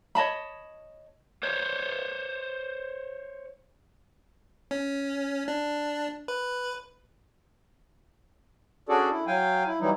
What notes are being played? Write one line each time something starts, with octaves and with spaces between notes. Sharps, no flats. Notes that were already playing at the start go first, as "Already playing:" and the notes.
C#5 D#5 A5 B5
C5 C#5
C#4
D4
B4
C#4 D4 F#4 G#4 A4 D5
E4
F#3 F5 G5 G#5
E4
E3 F#3 G3 D#4 E4